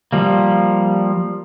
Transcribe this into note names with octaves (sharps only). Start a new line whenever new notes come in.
F3 G3 A#3